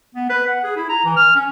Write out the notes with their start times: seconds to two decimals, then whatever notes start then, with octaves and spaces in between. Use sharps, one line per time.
0.15 B3
0.30 B4
0.47 F#5
0.64 G#4
0.77 E4
0.89 A#5
1.05 E3
1.17 F6
1.35 C#4